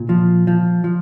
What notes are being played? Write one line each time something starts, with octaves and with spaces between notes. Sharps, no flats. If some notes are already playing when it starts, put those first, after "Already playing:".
Already playing: A#2
F3
F3
F3